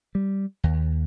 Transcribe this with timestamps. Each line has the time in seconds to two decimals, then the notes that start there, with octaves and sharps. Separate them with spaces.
0.15 G3
0.64 D#2